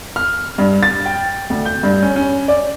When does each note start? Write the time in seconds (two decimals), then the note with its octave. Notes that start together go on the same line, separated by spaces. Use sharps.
0.16 F6
0.58 G2
0.83 A6
1.06 G5
1.50 D2
1.65 G6
1.83 G2
2.03 C#4
2.16 C#4
2.48 D5